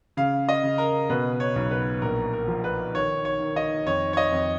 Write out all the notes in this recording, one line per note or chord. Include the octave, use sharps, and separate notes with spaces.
C#3 F5
D#5
C#3
A#4
B2 B4
C#5
B1
B4
A#1 A#4
A#4
F3
B4
D#3 C#5
C#5
D#3
D#5
F2 C#5
C#5
D#5
F2